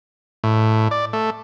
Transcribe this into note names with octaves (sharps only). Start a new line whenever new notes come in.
A2
D5
A3